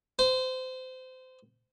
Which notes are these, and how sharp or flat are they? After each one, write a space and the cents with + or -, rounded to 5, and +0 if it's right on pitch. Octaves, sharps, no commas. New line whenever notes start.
C5 -25